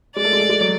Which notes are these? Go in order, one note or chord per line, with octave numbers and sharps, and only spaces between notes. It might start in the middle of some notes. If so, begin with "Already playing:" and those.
G#3 D5
A3
G#3
A3
G#3
F#3